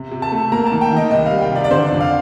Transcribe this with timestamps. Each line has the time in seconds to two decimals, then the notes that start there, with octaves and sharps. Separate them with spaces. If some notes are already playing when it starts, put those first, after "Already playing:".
Already playing: C3
0.11 C3
0.22 A5
0.32 A3
0.52 A#3 A#5
0.67 A5
0.72 D#3
0.81 G5
0.91 D#3
0.96 D#5
1.11 C2 D#5
1.26 F5
1.31 G3
1.41 G5
1.51 C3 D5
1.64 D5
1.71 D3 C5
1.86 D5
1.91 F2
2.01 F5